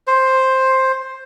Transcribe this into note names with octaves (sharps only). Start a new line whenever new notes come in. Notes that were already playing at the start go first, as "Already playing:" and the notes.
C5